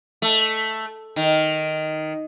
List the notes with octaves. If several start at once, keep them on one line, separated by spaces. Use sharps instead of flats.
A3
D#3